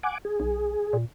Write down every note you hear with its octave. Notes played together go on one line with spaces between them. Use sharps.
F#5 G#5 D6
G#4
B1
A#2